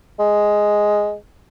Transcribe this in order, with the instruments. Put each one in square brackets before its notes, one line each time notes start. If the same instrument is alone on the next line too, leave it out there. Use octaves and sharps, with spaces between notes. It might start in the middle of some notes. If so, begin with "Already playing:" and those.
[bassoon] G#3